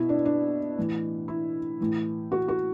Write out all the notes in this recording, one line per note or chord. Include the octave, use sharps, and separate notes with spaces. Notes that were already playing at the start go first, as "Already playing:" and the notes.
Already playing: B2 E4
D4
D4
A2 E3
E4
A2 E3
F#4
F#4